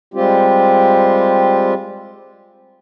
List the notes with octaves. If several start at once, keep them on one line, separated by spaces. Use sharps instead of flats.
G3 G#3 C4 F4 G4